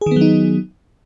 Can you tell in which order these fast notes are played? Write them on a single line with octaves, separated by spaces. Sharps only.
G#4 D#3 B3 F#3 D#4